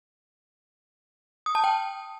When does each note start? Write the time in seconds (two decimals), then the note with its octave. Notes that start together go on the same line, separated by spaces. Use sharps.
1.46 D#6
1.55 A5
1.64 G5